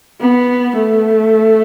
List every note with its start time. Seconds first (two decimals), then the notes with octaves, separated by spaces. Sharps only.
0.21 B3
0.76 A3